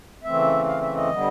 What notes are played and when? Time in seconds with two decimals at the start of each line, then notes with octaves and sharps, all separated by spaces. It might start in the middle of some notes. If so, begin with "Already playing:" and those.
0.24 C#3 E3 A3 C4 E5
0.66 F5
0.81 E5
0.95 D#5
1.11 D3 G3 B3